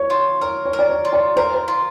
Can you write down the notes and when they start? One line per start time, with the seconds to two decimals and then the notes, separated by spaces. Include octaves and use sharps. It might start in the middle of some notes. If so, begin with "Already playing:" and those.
Already playing: C#5
0.10 F4
0.41 A#4 C#5
0.65 C#5
0.73 A#4
0.79 D5
0.89 C#5
1.05 F4
1.13 D5
1.36 A#4 C5
1.54 C5
1.68 F4